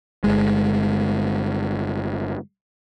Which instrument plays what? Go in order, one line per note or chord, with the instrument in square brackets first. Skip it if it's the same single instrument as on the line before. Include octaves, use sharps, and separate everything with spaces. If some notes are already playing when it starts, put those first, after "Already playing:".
[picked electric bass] G1 G#3